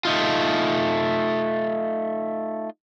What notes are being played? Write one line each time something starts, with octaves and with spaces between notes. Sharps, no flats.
A3 D#4 F4